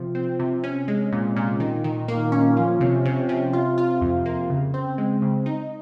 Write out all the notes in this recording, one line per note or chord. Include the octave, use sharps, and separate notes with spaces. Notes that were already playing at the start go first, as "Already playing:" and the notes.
Already playing: C3 F3
C4
C3
C#4
G#3
A#2
A#2
D#3
D#3
A#3
C#4
F3
C3
C3
C3
F4
F4
F2
A#3
C#3
C4
G#3
C#3
D#4